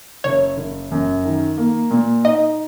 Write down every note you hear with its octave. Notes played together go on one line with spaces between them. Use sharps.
F#1 C#5
F#1
F#2
D#3
A#3
A#2
D#4 D#5